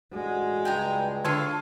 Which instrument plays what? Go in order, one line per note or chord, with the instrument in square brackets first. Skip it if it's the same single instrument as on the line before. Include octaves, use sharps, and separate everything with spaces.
[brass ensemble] A1 D4 F#4 [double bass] G#3
[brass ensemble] C#2 G2 [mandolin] G5 G#5 A#5
[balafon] D3 D4 [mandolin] F4 A4 C#5